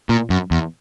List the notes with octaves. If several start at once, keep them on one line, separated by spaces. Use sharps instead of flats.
A#2
F#2
E2